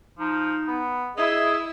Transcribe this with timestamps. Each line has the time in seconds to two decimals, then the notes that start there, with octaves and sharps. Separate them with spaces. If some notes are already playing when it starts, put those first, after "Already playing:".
0.19 F3 D#4
0.68 B3
1.17 E4 G#4 D#5 E5